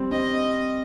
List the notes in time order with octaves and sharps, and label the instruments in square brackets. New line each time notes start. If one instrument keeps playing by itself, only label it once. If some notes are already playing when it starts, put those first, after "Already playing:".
Already playing: [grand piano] G3 C4
[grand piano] C4 [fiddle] D#5